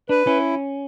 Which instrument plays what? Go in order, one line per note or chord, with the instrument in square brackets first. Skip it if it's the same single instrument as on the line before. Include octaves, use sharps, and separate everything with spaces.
[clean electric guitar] D4 [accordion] B4
[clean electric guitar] C#4 [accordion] E4